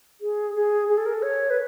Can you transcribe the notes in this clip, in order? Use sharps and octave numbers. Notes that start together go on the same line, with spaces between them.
G#4
G#4
G#4
A4
A#4
A4
C#5
B4